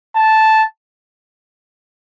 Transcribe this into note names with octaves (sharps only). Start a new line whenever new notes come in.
A5